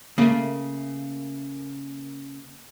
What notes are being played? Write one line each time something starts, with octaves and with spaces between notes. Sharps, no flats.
C#3 A3 A#3